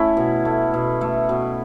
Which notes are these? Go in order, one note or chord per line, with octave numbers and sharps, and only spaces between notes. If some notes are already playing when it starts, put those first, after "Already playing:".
Already playing: A3 C#4 E4
B2
A3
B2
A3
B2